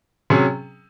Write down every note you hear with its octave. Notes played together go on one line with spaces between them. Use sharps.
C3 F#3 C#4 G#4